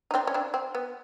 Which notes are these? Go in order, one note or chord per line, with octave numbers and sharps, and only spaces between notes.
D#4
C4 D4
C#4
C4 D4
C4
B3